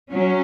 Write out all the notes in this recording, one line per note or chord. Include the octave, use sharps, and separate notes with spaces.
F#3 C#4